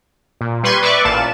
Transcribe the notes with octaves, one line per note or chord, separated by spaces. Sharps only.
A#2
G3 B4 C6 C#6 G#6 D#7
B4 D5 E5 C#6 D6
A1 A#2 F5 A5 E7